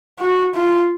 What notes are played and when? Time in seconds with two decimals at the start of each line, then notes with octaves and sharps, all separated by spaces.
0.19 F#4
0.55 F4